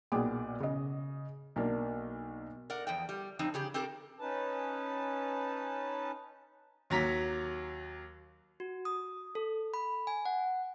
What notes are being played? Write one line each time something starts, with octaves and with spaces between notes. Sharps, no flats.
B1 A#2 B3 G#4 G5 D6
C#3 D#5
B1 A#3 D4
A#4 D5 F#5
E2 F3 G5
G3
F2 F3 C4 D#4
C#3 G4 G#4
C4 G4 A4 A#4
C#4 D#4 B4 A5
D#2 F#3 A#5 B6
F#4
D#6
A4
B5
G#5
F#5